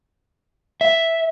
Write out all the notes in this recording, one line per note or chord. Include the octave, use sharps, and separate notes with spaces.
E5